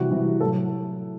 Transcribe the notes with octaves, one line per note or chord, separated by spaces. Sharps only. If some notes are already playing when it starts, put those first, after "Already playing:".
Already playing: C3 E3 G3 F#4
C3 E3 G3
A2 F#3 A4